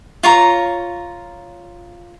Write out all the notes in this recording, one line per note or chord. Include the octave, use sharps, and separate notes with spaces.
F4 C#5 A#5